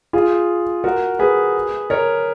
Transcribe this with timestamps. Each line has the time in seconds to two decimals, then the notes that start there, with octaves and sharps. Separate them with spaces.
0.13 F4 G#4
0.84 F#4 A#4
1.19 G#4 B4
1.90 A#4 C#5